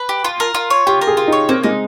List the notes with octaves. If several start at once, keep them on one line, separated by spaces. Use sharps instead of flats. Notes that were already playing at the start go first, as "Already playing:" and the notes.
Already playing: B4
G4
F4
A#4
F4
C#5
F4 G4
A#4
G#4
F4
D#4
C#5
A#3 C4
G#3 D#4